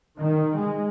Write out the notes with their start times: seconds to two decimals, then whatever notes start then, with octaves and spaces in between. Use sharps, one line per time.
0.18 D#3
0.57 G#3